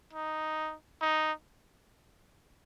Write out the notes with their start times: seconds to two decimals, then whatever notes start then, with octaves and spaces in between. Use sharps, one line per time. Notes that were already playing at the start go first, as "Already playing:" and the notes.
0.13 D#4
1.01 D#4